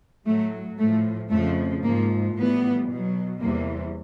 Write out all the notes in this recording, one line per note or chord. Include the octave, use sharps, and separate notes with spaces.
A2 F#3 A3
A2 F3 A3
F2 C#3 F3 A3
G#2 F3 A#3
A2 E3 G3 B3
B2 F#3
E2 C3 E3 G3 A#3